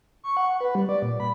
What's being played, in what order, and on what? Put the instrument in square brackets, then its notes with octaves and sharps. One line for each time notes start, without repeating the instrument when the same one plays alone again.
[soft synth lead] C#6
F#5
B4
G3
D5
A#2
B5